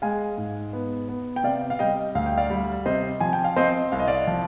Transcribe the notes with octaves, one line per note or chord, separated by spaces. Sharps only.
G#3 F5 G#5
G#2
B3
B3
G5
C3 D5 F5
F5
G3 D#5 G5
D2 F5
G5
D5 F5
G3
C3 C5 D#5
F3 G#5
G5
F5
C4 C5 D#5
C2 F5
D#5
D5 F5
F3